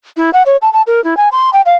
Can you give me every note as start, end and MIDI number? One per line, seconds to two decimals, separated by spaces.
0.17 0.30 64
0.33 0.42 78
0.46 0.56 73
0.62 0.72 81
0.73 0.82 81
0.87 1.03 70
1.04 1.17 64
1.17 1.29 80
1.32 1.50 84
1.53 1.61 79
1.66 1.75 77